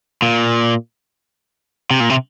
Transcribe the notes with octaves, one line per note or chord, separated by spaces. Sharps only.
A#2
C3
A#2
C3